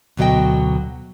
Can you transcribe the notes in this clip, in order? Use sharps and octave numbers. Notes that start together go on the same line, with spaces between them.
D2 B2 F#3 D#5 G5